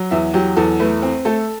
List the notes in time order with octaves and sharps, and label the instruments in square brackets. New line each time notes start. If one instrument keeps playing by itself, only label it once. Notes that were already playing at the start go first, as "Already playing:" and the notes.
Already playing: [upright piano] F#3
E2 E5
F#3 G4
E2 A4
A3 B4
C4
A3 A4